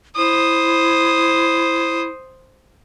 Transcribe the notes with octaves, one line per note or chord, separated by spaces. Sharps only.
E4 C5 D#6